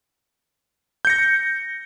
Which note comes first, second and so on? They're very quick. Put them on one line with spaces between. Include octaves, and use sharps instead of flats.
G6 C#7 A#6